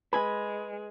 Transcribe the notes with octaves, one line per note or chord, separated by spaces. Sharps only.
G#3 B4 G#5 B5